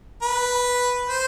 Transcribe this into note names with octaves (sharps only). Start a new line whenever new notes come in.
B4
C5